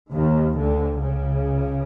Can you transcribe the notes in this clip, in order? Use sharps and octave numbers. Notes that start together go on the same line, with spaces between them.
D#2 D#3
D2 D3
C#2 C#3